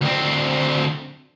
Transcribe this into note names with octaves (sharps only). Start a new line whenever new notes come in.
D2 C4